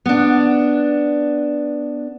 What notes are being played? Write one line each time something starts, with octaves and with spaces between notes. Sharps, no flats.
B3 D4